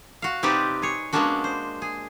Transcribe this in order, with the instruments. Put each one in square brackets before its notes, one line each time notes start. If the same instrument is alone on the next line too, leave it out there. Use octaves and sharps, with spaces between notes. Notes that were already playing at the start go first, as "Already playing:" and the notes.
[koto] F#4 F5
C3 C4 D#4 G4 B4 D5
G#4 C#5
G#3 A#3 B3 C#4 D4 F#4
C5
G#4